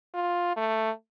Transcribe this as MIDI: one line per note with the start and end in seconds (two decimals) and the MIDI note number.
0.14 0.54 65
0.57 0.91 57